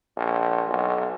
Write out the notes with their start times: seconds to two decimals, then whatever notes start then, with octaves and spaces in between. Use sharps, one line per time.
0.17 A#1
0.68 B1